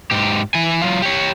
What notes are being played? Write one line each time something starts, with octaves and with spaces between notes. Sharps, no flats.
G#2 G4
E3 G#5
F#3 F4
G4 C#5